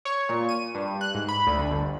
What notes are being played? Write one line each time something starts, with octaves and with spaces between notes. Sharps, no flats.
C#5
A#2
D#7
G2
F#6
G#2
B5
D2
D3
G1